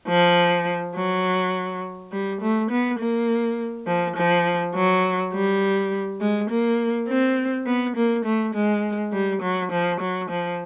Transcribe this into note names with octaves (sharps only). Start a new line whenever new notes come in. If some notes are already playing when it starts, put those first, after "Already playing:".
F3
F#3
G3
A3
B3
A#3
F3
F3
F#3
G3
G#3
A#3
C4
B3
A#3
A3
G#3
G3
F#3
F3
F#3
F3